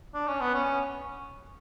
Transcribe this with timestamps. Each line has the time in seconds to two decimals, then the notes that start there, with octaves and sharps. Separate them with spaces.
0.14 D4
0.28 C#4
0.41 B3
0.54 C#4